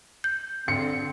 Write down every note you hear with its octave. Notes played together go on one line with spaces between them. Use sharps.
G6
D3 C4 C#7